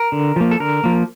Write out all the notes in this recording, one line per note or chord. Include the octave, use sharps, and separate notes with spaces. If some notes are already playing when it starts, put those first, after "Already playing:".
Already playing: A#4
D3
F3 A#3
A4
D3 A#4
F3 A#3